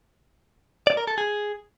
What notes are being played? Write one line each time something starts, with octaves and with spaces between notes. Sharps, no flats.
D5
A#4
A4
G#4